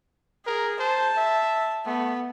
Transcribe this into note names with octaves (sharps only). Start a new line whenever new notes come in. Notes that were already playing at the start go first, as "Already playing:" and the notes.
G#4 A#4
C5 A5
E5
A3 B3